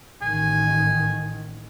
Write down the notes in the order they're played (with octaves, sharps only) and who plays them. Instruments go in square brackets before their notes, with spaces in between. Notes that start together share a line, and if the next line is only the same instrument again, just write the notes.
[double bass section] A1 D#3 [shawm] G#5